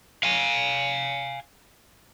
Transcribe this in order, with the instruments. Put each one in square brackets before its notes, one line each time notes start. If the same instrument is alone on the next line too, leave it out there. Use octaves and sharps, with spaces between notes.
[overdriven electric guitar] F5 G#5